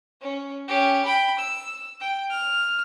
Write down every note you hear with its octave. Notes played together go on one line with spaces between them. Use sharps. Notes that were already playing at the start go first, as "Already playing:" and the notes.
C#4
C#4 G4
G5 B5
E6
G5
F6